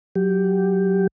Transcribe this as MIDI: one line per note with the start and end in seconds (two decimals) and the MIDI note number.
0.15 1.07 54
0.15 1.07 67